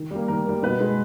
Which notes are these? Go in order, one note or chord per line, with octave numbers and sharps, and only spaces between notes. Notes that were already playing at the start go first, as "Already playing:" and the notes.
Already playing: D#3
G3 A#3
D#3 A#4
G3 A#3
B2 B4
G#3